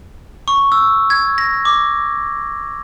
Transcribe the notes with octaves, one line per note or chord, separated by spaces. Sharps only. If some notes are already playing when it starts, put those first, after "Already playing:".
C#6
E6
G#6
A#6
D6